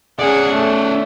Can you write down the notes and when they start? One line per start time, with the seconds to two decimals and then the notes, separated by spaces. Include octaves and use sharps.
0.19 C#4 G#4 D5 F#5
0.52 A3